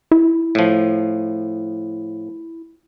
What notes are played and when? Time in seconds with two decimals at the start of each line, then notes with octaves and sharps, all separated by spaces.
0.11 E4
0.55 A2 F3